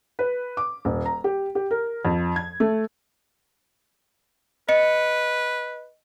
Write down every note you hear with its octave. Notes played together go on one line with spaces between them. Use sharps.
B4
D6
D#1
A#5
G4
G4
A#4
F2
G#6
A3
B4 D#5 C#7